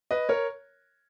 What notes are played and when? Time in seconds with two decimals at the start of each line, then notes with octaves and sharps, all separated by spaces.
0.11 B4 D#5
0.29 A#4 C#5